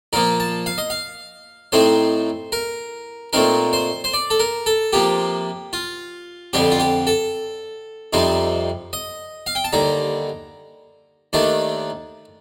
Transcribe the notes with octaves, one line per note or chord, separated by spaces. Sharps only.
A#2 F3 A#3 A#4
A5
F5
D#5
F5
A2 A3 C4 D#4 C5
A#4
A#2 A3 C4 D#4 A#4
C5
C5
D5
A4
A#4
A4
C3 F3 A#3 G4
F4
F2 D3 G3 C4 G4
F4
G4
A4
F2 C3 G3 C4 D#4
D#5
F5
G5
A5
D#2 D3 G3 A#5
D#2 D#3 A3 D4